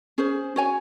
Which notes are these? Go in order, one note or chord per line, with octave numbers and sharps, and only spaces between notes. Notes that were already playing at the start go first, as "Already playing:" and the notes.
C#4 G#4 C5
F#4 C#5 G#5